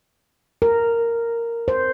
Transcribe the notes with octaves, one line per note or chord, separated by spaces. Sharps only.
A#4
C5